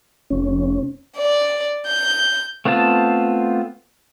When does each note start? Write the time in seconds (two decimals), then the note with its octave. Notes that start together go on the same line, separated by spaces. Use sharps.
0.30 F1 C#4
1.17 D5
1.87 G6
2.65 A3 B3 C4 F4 A5